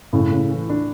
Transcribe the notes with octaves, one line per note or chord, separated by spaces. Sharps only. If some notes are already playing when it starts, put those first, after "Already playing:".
A2 C#3
C#3
E3
D4